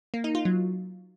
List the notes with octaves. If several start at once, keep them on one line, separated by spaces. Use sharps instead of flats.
A#3
D#4
F4
F#3